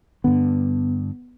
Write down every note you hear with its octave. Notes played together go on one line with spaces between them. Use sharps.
G2 D3 B3